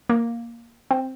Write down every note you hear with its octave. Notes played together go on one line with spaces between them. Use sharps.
A#3
C4